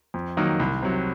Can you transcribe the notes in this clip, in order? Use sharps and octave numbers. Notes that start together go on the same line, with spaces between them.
F2
D#3 F#3 A#3 D#4
C2
C3 F#3